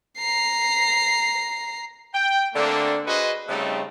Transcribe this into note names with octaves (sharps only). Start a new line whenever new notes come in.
A#5 C7
G5
D3 A3 A#3 C4 D4
F#4 G#4 B4 C5 D#5
C#3 G3 A3 C4 D#4